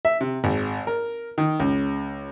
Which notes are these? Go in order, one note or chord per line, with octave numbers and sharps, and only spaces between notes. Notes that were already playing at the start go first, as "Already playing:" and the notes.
E5
C3
G#1
A#4
D#3
C#2